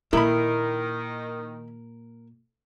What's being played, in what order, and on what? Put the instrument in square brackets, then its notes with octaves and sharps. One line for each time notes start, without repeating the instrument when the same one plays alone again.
[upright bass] A#2 A#3 [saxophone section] D#3 [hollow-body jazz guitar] E4 B5 [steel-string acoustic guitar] A#4